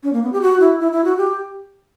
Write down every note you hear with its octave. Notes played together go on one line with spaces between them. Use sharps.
C#4
A#3
B3
G4
F#4
E4
E4
E4
F#4
G4